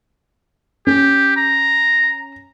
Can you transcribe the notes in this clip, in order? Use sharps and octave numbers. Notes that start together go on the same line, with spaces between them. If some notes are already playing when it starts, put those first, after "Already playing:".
C#4 G4
A#5